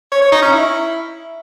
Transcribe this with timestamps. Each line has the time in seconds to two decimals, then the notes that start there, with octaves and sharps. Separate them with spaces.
0.12 C#5
0.22 C#5
0.32 D#4
0.42 C#4
0.52 E4